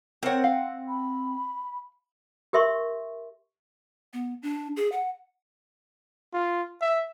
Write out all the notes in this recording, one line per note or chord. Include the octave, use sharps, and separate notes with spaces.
C4 A#4 C5 C#5 F#5 G5
F5
B5
G4 A#4 E5 C6 C#6
B3
D4
G#4
F#5
F4
E5